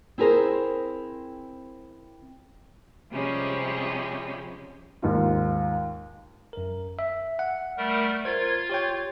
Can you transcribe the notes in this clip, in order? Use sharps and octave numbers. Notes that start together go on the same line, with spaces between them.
C4 E4 G#4 A#4 C5
C3 F3 G3 G#3 C#4
D#2 G#2 F4
F#2 A#4
E5
F#5
G3 A3 A#4
F4 A#4 C5 G#6
G4 C#5 G5